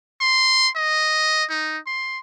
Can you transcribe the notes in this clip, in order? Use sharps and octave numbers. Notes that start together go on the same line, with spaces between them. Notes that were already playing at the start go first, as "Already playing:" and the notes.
C6
D#5
D#4
C6